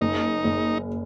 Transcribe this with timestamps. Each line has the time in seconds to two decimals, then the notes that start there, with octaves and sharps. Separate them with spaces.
0.01 F#1 D#4
0.44 F#1